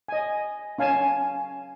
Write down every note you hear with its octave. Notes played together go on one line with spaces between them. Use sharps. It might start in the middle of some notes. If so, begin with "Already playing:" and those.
D#5 G#5
C#4 F5 G#5 A5